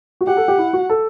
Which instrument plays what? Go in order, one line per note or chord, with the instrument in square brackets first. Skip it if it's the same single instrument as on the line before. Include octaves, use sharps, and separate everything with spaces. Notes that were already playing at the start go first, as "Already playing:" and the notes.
[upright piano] F#4
[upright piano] G4 [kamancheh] F#5
[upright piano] A4
G4
E4
F#4
A4